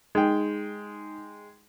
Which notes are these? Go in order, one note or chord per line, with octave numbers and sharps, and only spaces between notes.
G#3 D#4 G5